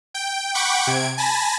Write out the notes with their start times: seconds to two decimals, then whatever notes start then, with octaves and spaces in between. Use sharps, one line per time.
0.14 G5
0.54 F#5 G5 B5 C#6 D6
0.87 C3 G#6 D7
1.18 G#5 A5 B5 A#6